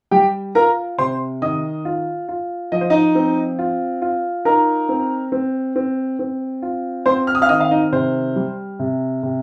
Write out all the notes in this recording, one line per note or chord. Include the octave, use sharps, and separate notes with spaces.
G3 G4 G5
F4 A#4 A#5
C3 C5 C6
D#3 D#5 D#6
F4
F4
F3 D#5
C5
D#4 D#5
C4
F4
F4
D#4 A#4 A#5
C4
C4
C4
C4
F4
C4 C5 C6
F6
D#6
F5 F6
D#3 D#5 D#6
F5
D#4 D#5
C3 C5
G3
C3
C3